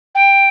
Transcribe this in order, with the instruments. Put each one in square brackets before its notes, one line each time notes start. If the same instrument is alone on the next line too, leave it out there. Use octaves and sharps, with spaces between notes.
[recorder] G5